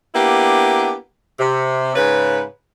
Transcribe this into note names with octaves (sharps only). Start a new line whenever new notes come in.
A#3 B3 D4 E4 G4
C3
G#2 C#3 B4